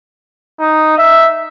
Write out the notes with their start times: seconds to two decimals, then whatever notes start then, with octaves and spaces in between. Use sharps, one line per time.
0.60 D#4
0.98 E5